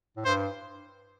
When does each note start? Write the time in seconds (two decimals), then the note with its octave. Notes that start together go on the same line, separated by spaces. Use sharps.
0.16 A2
0.25 G2 C5